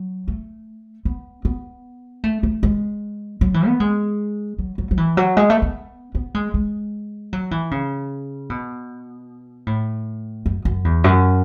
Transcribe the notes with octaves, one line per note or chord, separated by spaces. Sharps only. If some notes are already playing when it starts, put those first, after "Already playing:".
Already playing: F#3
A3
B3
B3
A3
A3
G#3
F#3
E3
B3
G#3
F#3
F#3
F#3
E3
F#3
G#3
A3
B3
B3
G#3
G#3
F#3
E3
C#3
B2
A2
F#2
F#2
E2
F#2